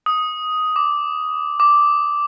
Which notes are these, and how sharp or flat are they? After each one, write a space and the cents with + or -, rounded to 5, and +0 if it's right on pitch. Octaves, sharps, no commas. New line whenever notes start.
D#6 +5
D6 -5
D6 -5